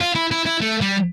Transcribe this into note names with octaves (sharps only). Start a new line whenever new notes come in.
F4
E4
E4
E4
A3
G3